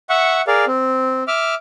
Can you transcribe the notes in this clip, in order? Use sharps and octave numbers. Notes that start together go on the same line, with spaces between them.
E5 F#5 C#6
G#4 A#4 D5 F5
C4
E5 D6 F6